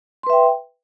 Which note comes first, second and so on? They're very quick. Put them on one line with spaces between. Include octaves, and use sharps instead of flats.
C6 B4 E5 G5